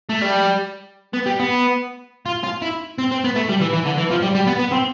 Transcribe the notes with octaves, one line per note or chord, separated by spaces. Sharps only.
A3
G3
B3
G3
B3
F4
F4
E4
C4
C4
B3
A3
G3
E3
E3
D3
E3
F3
G3
G3
B3
B3
C4